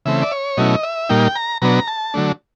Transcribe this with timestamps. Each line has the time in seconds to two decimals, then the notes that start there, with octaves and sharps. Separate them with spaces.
0.06 C#3 E3 A3 C4 E5
0.22 D5
0.32 C#5
0.57 B2 F#3 A3 C#4 E4 D#5
0.83 E5
1.09 A#2 G3 A#3 D#4 G5
1.36 A#5
1.62 B2 F#3 B3 D4 A#5
1.88 A5
2.14 D3 F#3 A3 D4